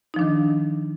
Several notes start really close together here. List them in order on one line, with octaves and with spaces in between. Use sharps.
D#4 F3 D4 D#3